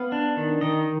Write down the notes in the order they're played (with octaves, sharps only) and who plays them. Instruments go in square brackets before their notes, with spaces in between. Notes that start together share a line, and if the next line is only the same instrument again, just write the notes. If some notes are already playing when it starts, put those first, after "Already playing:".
Already playing: [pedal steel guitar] B3 F5
D4
D#3
D#3 D#5